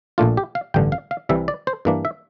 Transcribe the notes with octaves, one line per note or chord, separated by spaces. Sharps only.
A#1 A#2 A3 D4 F4
G4
F5
A1 G2 D3 G5
F5
F5
C2 C3 E3 G3 E5
D5
C5
G2 E3 A#3 D4
E5